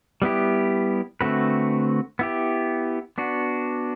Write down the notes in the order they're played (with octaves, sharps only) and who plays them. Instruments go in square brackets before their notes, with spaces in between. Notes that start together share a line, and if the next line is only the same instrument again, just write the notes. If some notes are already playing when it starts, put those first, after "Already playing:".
[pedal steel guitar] G3 B3 E4 G4
D3 A3 C4 F#4 B4
B3 E4 G4
B3 D4 F#4